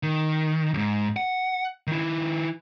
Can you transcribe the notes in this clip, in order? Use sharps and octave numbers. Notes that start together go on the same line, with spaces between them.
D#3
E2 G#2
F#5
D#3 E4